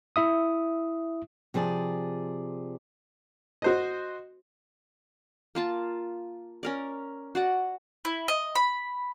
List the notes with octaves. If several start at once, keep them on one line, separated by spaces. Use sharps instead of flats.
E4 E5 D#6
C3 F3 G#4 D5
F#4 C5 D#5
A#3 F4 A5
C#4 A#4 D5
F#4 D5 F#5
E4
D#5
B5